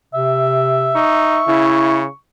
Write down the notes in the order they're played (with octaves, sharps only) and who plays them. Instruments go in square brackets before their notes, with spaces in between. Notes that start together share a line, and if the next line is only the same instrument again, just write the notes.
[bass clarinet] C3 [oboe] E5
[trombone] D#4 [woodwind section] C#6
[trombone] C#3 [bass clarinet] E4